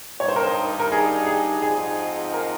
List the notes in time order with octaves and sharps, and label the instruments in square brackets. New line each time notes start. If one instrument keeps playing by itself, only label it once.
[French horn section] G2 D#3 G3 C4 D#4 [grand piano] C#5
[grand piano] C5
A#4
C5
A#4
G#4
G#4
[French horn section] G#2 F3 C4 D#4 [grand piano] G#4
[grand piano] A#4